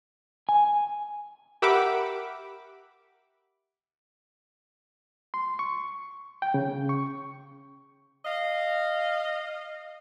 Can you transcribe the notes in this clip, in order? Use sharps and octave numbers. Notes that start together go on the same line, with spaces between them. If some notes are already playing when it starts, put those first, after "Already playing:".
G#5
G4 A#4 E5 F#5 B5 D6
C6
C#6
G5
C#3
C#6
D#5 F5